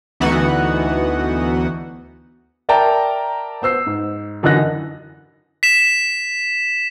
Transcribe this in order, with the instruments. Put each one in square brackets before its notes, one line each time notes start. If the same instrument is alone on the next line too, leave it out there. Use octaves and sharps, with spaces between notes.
[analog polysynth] D2 E3 B3 D#4 F#4 F#5
[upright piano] A#4 D5 E5 G5 A5 A#5
B3 C5 E6 C7
G#2
F#2 D3 E3 D#4 F#6 A#6
[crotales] B6 E7